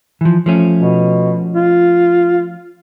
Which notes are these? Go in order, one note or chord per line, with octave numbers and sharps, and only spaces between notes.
E3 F3
F3 A3 C#4
B2
F4